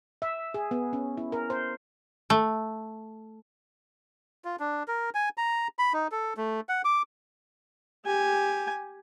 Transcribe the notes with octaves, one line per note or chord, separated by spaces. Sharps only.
E5
G#4
B3
C#4
E4
A#4
C5
A3
F4
D4
A#4
G#5
A#5
B5
D#4
A4
A3
F#5
D6
G4 G#5